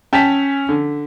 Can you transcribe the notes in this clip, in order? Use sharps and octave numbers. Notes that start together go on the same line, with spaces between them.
C#4 G5 A5 B6
D3